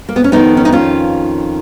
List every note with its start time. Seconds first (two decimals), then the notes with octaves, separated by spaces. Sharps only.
0.09 A#3
0.16 B3
0.24 C#4
0.32 F2 D#3 B3 D#4
0.57 C#4
0.65 D#4
0.72 C#4 F4